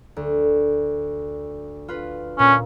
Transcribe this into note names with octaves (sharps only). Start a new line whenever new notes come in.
D2
F4 B4
A#2 C#4